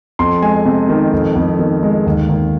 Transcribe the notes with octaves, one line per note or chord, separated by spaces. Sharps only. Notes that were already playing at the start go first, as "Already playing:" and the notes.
F2 C6
G#3 G#5
C3
D#3
F2
F2
D#3
G#3
D#2
D#2